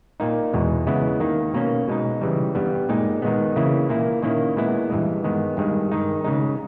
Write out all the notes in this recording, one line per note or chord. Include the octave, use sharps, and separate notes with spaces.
A#2 A#3 D#4
E2 B2 G#3
C#3 G#3 B3 E4
D#3 A#3 D#4
B2 A#3 C#4
B2 G#3 D#4
C#3 E3 G3
G2 G3 B3
A#2 G#3 D#4
D#3 G#3 B3
C#3 E3 A#3 E4
A#2 A#3 E4
D#3 A#3 C#4 E4
A#2 G#3 B3 E4
G2 E3 G#3
D#3 G#3 B3
G2 D#3 G#3
D#3 G#3 D#4
C#3 G#3 D#4